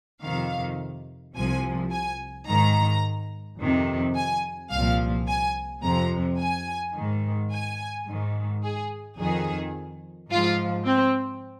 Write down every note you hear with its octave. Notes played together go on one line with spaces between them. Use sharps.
F2 C3 D#3 F5
C2 C3 F3 G#5
G#5
G#2 D#3 A#5
F2 C3 D#3
G#5
C2 A#2 F3 F5
G#5
F2 C3 F3 A#5
G#5
G#2 D#3
G#5
G#2 D#3
G#4
F2 D#3 G#4
G#2 F3 F4
C4